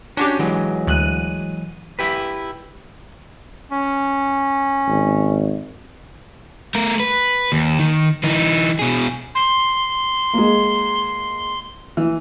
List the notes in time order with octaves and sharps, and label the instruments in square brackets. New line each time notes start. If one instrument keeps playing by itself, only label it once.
[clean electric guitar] C#4 C#5 [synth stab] D4 F#4 G4
[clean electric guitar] E3 F#3 G#3
[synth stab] D2 F#6 D#7
[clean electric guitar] E4 G4 B4
[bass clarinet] C#4
[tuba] G#1
[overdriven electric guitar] A3 A#4
B4
D#2
D#3
E3 D#4
B2 G#4
[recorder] C6
[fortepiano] G#3 A#3
E3